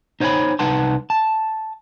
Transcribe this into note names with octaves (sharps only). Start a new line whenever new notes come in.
D#4 C5 C#5 F5 G#5 B5
C2 D#4 B4 F#5 A5 C6
A5